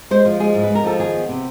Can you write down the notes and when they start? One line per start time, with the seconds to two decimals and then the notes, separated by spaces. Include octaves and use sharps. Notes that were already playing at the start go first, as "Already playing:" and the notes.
0.11 G#3 C5
0.25 F3 C5
0.40 G#3 G#4
0.54 G#2
0.63 B4
0.70 G#3 A#4
0.84 F3 A4
0.99 D#3 G#4
1.14 B3
1.29 C3